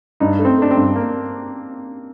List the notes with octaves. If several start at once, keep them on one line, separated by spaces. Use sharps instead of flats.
G2 D#4
A3
C4
A3 D4
C4
G2
A#3